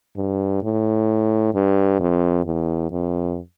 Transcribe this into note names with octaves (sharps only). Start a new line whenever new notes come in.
G2
A2
G2
F2
E2
F2